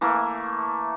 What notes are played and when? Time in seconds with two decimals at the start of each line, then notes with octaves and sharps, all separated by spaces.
0.01 E3 A3 A#3